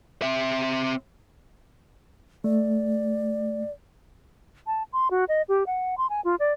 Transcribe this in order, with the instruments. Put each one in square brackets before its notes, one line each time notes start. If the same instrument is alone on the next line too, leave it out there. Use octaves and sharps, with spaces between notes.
[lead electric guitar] C4 E5
[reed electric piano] A3 [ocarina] D5
[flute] A5
C6
F#4
D#5
G4
F#5
C6
G#5
F4
D5